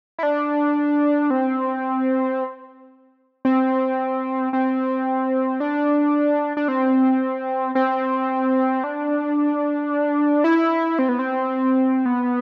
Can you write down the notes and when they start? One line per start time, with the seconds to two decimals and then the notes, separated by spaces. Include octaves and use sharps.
0.19 E4
0.23 D4
1.30 C4
3.45 C4
4.53 C4
5.60 D4
6.57 D4
6.68 C4
7.75 C4
8.84 D4
10.44 E4
10.99 C4
11.09 B3
11.19 C4
12.06 B3